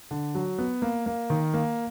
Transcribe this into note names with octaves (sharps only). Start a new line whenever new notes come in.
D3
F#3
B3
A#3
A#3
D#3
A#3